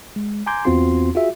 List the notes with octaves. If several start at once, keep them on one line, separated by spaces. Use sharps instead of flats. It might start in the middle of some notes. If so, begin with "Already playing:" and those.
G#3
G#5 A#5 C6 D6 G6 G#6
E2 B3 C4 F4 F#4 C6
F4 F#4 G#4 E5